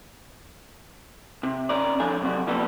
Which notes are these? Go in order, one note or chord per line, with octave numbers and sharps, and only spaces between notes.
C3
C#4 A#4 D5
F2 F3 D4 A4 G#5
F#2 C3 F#4
B2 F3 G3 A#3 B3 A4